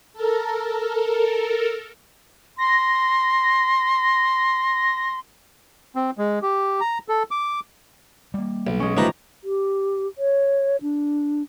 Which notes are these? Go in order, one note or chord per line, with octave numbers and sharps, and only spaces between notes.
A4 A#4
C6 A#6
C4
G#3
G4
A#5
A4
D6
G3 A#3
B1
G#3 C#4
A1 F3 A3 D#4 G4 B4 A#5
G4
C#5
D4